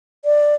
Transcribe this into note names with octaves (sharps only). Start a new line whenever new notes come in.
D5